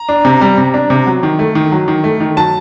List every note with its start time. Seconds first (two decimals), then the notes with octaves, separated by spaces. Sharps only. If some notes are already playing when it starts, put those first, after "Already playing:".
Already playing: A#5
0.09 D4
0.25 C3
0.41 G3
0.58 C3
0.74 D4
0.90 C3
1.06 F#3
1.23 D#3
1.39 A3
1.55 D#3
1.72 F#3
1.88 D#3
2.04 A3
2.20 D#3
2.37 F#3 A5